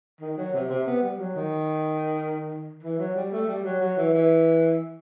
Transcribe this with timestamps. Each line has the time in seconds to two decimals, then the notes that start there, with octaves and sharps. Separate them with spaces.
0.21 D#3
0.37 F#3
0.53 C3
0.70 C3
0.87 B3
1.02 G3
1.18 F#3
1.35 D#3
2.83 E3
2.99 F#3
3.16 G3
3.32 A3
3.48 G3
3.64 F#3
3.81 F#3
3.97 E3
4.14 E3